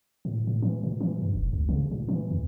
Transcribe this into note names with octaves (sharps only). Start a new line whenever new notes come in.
A2
A2
E3
A#2
E3
G2
F1
C#2
C#3
A#2
E3
E2